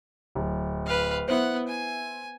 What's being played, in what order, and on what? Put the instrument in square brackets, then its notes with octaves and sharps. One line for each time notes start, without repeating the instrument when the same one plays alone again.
[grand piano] D1
[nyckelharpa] B4 F5
[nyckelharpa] B3 F#5 [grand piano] E4 C5
[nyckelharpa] G#5